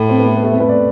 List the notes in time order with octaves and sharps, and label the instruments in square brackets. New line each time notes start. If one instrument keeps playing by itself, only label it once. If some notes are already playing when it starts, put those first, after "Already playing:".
Already playing: [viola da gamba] A2
[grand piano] C4
B3
A3
B3
A3
C4
B4
D5